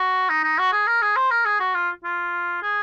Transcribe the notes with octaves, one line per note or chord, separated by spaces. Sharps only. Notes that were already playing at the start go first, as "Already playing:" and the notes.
Already playing: F#4
D#4
D#4
F#4
G#4
A#4
G#4
C5
A#4
G#4
F#4
F4
F4
G#4